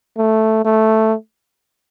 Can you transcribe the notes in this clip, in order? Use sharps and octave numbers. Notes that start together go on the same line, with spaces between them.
A3
A3